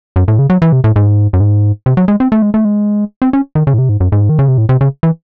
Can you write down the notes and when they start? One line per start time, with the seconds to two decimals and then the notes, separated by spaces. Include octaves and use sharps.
0.16 F#2
0.28 A2
0.39 C#3
0.50 F#3
0.62 E3
0.73 C3
0.84 A2
0.96 G#2
1.33 F#2
1.40 G#2
1.86 C3
1.97 F#3
2.08 G#3
2.20 C4
2.32 A3
2.42 G#3
2.54 A3
2.65 G#3
3.22 C4
3.33 C#4
3.55 D#3
3.67 C#3
3.74 A2
3.78 C3
3.89 G#2
4.00 F#2
4.12 G#2
4.29 D#3
4.39 C#3
4.48 C3
4.58 A2
4.69 C3
4.81 C#3
5.03 E3